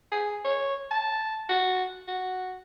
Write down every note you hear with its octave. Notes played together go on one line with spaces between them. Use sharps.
G#4
C#5
A5
F#4
F#4